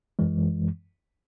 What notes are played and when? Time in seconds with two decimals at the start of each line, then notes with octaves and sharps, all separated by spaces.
0.19 F#2 E3 G#3